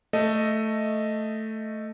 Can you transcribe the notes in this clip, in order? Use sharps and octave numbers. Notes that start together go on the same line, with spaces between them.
A3 D#5